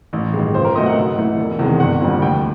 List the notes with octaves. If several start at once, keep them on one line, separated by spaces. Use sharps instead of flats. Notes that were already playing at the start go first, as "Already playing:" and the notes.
A1
G2 D#3 G#3
C#2 C5
A#4
B2 F#3 A3 C4 D#5
F#5
G#2
E3 A3
E1
E2 C3 D#3 G#3
G1 F#5
F2 D3 G3 A#3
D2 G5